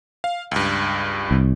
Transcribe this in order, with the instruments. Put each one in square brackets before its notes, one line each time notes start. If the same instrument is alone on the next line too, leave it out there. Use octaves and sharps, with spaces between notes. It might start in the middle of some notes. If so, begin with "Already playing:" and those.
[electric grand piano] F5
C#2 G2
[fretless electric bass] C2